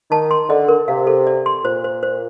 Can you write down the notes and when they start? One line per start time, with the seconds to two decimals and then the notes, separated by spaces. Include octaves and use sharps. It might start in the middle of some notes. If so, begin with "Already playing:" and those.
0.11 D#3 A5
0.31 C6
0.49 D3 D#5
0.68 A#4
0.88 C3 F5
1.07 A4
1.27 D5
1.46 C6
1.64 A#2 C5
1.84 C5
2.03 C5